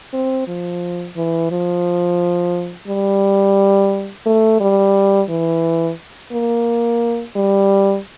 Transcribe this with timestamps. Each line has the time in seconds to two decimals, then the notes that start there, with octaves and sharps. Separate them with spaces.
0.13 C4
0.47 F3
1.16 E3
1.51 F3
2.88 G3
4.26 A3
4.60 G3
5.29 E3
6.32 A#3
7.36 G3